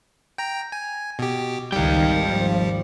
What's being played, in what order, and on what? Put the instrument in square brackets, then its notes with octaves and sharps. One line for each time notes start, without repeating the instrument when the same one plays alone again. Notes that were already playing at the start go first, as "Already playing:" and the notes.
[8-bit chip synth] G5 A#5
G#5
B2 G4
[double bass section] G#1 C#2 D#3 [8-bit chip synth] G3 [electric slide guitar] F5 G5
[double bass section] G#1 D#2 F3